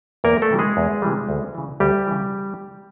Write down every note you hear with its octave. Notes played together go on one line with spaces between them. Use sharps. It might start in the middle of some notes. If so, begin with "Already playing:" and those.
E2 A#3 A#4
A3 A4
C3 E3 G3
G#3 G#4
E2
C3 E3 G3
D2
C#3 E3
D2 G3 G4
C#3 E3